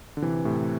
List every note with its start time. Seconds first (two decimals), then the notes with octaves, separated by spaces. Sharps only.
0.17 D3
0.22 C3 E3
0.45 A2 C3